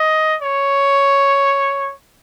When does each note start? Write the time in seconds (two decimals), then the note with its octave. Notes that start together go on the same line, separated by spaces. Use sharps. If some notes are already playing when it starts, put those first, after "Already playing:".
Already playing: D#5
0.42 C#5